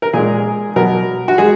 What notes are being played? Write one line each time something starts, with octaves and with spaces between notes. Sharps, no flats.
A#4
A#2 G#3 G#4
B2 F#3 A#4
F#4
G#3 G#4